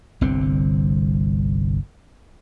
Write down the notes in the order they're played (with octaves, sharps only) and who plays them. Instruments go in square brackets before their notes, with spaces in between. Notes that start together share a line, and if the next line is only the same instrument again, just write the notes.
[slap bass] G1 C2 D3 C4